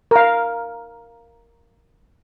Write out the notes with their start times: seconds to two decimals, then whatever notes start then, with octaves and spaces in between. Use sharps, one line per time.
0.11 A#4 F5